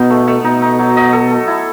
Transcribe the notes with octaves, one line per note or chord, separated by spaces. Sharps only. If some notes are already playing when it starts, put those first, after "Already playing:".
Already playing: B2 B3 D#4
A3
A3
B2 D#4
D#4
F#3
D#5
A4
A4
E4